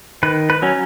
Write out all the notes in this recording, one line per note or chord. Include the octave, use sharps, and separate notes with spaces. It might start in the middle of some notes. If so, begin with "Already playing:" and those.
D#3 B4
B4
F#3 C#4